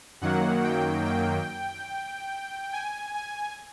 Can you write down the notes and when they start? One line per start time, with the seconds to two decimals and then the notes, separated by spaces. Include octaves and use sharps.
0.21 F#2 D#3 F#3 A#3 F#5
0.64 G5
1.05 G5
2.73 G#5
3.14 G#5